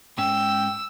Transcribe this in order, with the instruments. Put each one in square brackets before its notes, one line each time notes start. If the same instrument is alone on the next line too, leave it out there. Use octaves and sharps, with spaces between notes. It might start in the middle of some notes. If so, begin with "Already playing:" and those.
[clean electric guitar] G#2 G#3 C#4 [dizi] G5 [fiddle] E6